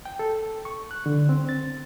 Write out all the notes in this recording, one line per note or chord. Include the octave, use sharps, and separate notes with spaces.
G5
A4
C#6
F#6
D3
C4
A6